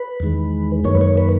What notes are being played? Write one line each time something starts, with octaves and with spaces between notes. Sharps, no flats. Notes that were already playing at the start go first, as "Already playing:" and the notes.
Already playing: B4
E2 D#3 G#3
F#2 D#3 A#3 C#5
B4
C#5
B4